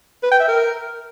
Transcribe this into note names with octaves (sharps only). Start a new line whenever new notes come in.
B4
G5
E5
A#4